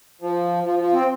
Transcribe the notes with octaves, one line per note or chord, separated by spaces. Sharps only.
F3
F3
F3
C4